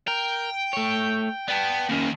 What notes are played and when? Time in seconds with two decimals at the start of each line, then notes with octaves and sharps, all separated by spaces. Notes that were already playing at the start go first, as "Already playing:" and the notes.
0.08 A#4 G5
0.73 A3 C#5
1.48 B3 D5 G5 A5
1.89 D#2 D#3 A#3 C#4 A#4